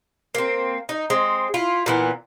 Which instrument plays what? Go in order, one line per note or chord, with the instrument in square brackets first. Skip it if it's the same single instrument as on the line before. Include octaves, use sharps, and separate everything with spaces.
[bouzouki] A#3 C4
D#4
G#3 C4
E4 F4
A#2 E3 B3